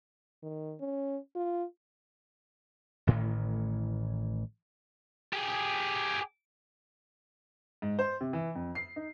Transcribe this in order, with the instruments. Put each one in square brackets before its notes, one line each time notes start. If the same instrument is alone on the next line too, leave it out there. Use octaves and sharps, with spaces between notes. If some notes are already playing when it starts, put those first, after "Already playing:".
[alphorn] D#3
C#4
F4
[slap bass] A1 A2 D#3 E3
[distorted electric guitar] G4 G#4
[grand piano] G#2
C5
C3
E3
F2
C7
D#4